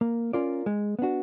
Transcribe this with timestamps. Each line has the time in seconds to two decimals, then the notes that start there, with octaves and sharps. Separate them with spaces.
0.01 A#3
0.33 C#4 F4 A#4 D5
0.66 G#3
0.99 B3 D4 F#4